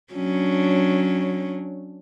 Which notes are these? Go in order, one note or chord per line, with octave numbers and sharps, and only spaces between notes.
F#3 C#4 D4